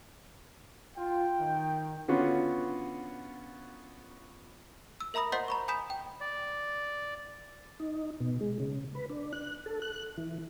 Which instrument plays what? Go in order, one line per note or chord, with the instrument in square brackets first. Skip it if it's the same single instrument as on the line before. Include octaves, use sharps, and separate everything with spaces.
[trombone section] F4 [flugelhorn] G5
[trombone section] D#3
[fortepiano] D3 B3 C#4 F4 F#4
[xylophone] E6
A#4 E5 A#5 B5 D#6 A#6
C5 D#5 F#5 C6 G6 B6
A#5 B5 C#6
G#5 B5 D#6 G6 B6 E7
G5
[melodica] D5
[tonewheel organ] D#4
B2
G#3
C#3
B4
D4
F#6
A4
F#6
E3